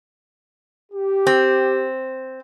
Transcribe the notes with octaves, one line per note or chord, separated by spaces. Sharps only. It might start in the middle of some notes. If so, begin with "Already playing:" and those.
G4
C4